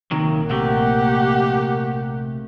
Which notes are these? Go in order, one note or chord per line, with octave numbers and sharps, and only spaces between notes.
A#1 C3 D#3 F#3 A#3
C3 A3 G4 F#5